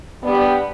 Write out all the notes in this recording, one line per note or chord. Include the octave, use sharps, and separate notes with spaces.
G3 B3 D4 G4